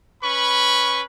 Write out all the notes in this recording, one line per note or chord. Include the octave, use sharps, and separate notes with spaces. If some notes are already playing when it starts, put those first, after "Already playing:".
C#4 B4 B5 C#6